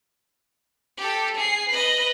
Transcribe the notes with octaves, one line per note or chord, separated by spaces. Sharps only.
G4 A4
G#4 C7
B4 D#5